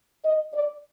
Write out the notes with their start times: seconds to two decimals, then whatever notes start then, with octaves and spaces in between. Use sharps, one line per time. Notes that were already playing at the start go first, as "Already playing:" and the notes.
0.25 D#5
0.54 D5